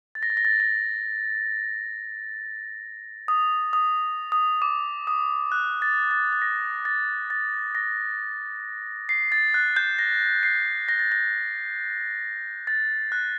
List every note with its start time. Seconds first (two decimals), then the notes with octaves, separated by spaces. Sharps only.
0.15 A6
0.23 A#6
0.30 A6
0.37 A#6
0.45 A6
0.60 A#6
3.28 D#6
3.73 D#6
4.32 D#6
4.62 D6
5.07 D#6
5.52 F#6
5.82 A6
6.11 A6
6.33 A6
6.42 A#6
6.85 A6
7.30 A6
7.75 A#6
9.09 C7
9.32 A6
9.54 F#6
9.76 G6
9.99 A#6
10.43 C7
10.89 A#6
10.99 A6
11.12 A#6
12.67 A6
13.12 F#6